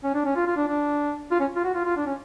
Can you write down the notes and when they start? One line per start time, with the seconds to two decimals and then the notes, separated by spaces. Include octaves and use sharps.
0.04 C#4
0.14 D4
0.25 C#4
0.36 F4
0.47 F4
0.57 D4
0.68 D4
1.31 F4
1.40 C#4
1.56 F4
1.64 F#4
1.74 F4
1.85 F4
1.96 D4
2.06 C#4